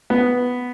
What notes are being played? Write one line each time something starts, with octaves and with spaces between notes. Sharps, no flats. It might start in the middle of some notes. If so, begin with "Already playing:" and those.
B3